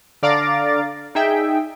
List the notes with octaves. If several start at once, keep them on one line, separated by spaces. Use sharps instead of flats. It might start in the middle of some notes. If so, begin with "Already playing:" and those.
D3 D5 F5 A#5 D6 A6
D#4 G#4 E5 G5